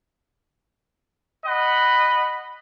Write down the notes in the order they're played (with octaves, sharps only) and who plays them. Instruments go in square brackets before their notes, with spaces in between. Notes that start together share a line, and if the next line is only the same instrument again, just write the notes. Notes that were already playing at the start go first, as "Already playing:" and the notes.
[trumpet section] D#5 F#5 B5